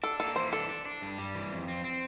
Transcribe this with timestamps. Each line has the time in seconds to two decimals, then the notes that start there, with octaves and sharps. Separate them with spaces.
0.03 D4 A4
0.20 A#3 A4
0.36 E3 C5
0.52 D4 A4
0.69 D4
0.86 D4
1.02 G2
1.18 G3
1.35 E3
1.52 F2
1.68 C4
1.84 C4